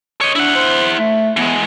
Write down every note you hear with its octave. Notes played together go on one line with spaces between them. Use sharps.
C#5 D#5
D4 E4 F#5
C5
A3
E3 G#3 B3